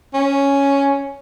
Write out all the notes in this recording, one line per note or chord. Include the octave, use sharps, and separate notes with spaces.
C#4